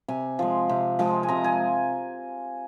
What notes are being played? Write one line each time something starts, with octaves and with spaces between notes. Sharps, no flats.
C3 G#5
F3 G#3
C3
F3 G#3
G#5
C3 A#5
G#5